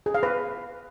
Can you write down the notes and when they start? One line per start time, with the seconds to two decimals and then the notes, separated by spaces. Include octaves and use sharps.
0.06 G#4
0.14 F5
0.23 B4